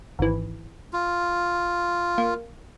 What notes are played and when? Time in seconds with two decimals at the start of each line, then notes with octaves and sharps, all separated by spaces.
0.19 G#1 E3
0.93 F4
2.18 A#3